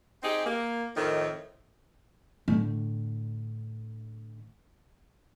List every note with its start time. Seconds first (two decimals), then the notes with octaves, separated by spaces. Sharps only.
0.23 C4 D#4 G4 G#4
0.45 A#3
0.97 F2 A2 D#3
2.48 A2 D3